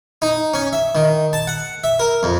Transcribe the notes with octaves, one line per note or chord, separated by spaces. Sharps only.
D#4
C#4
E5
D#3
A5
F#5
E5
A#4
F2